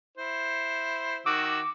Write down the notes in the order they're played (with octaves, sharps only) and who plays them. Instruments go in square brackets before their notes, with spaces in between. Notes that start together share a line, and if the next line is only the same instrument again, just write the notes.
[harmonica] E4 C5
[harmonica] D#3 F#4 E6 [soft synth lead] D6